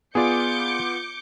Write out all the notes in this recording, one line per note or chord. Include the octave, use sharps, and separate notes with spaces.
B3 F4 G#4 D5 D6 G6 C#7